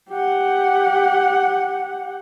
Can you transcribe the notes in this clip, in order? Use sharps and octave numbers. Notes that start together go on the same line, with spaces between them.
G4 F#5